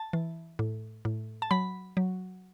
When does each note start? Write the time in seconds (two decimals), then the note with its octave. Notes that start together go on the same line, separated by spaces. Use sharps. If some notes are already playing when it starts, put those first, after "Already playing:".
Already playing: A5
0.13 E3
0.59 A2
1.05 A2
1.42 A5
1.51 F#3 B5
1.97 F#3